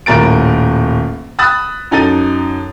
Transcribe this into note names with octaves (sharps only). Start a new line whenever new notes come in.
D#1 A2 A#4 A6 D7
B5 D#6 E6 F#6 A6
F#2 D#4 A4 A6 D#7